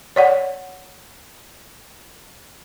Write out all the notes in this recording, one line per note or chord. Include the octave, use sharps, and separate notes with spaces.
C#5 D5 F#5